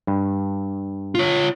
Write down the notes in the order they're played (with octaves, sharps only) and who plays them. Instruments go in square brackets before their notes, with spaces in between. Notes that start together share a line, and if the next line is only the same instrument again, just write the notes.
[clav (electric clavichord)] G2
[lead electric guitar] F4 C#5